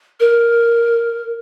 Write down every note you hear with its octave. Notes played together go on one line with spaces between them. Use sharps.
A#4